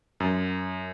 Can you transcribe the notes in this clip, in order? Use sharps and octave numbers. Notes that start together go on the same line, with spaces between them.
F#2